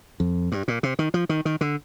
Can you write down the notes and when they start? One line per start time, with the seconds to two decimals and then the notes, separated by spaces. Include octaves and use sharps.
0.20 F2
0.52 G2
0.68 A#2
0.83 C3
0.99 D#3
1.14 F3
1.29 D#3
1.45 D#3
1.61 D3